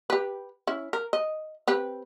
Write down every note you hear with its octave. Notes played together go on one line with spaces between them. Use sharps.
G4 B4
C#4 E4
A#4
D#5
C4 G4 B4